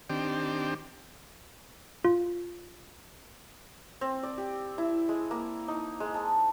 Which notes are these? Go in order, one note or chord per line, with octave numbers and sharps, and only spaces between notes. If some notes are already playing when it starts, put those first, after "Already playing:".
D#3 C4 D4 G4
F4
C4
D5
G4
E4
G#3
A#3
D#4
G#3
A5